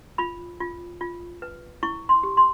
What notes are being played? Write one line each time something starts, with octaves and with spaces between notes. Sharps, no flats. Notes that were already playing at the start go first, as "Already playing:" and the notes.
F4 B5
F4
F4
B4
E4 C#6
C6
G4
C6